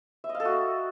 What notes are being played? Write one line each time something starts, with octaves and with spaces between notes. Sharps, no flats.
E5
D#5
F5
A4
F#4